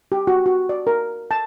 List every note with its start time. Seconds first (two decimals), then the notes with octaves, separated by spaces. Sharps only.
0.12 G4
0.27 F#4
0.46 F#4
0.69 D5
0.87 A#4
1.31 A5